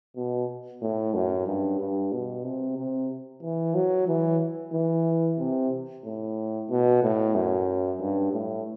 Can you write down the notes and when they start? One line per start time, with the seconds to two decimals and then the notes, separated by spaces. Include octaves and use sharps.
0.16 B2
0.82 A2
1.14 F#2
1.46 G2
1.79 G2
2.12 B2
2.44 C3
2.77 C3
3.43 E3
3.75 F#3
4.08 E3
4.73 E3
5.39 C3
6.04 A2
6.69 B2
7.03 A2
7.35 F#2
8.00 G2
8.33 A2